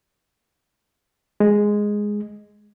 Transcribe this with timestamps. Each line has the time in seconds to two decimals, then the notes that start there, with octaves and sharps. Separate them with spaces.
1.40 G#3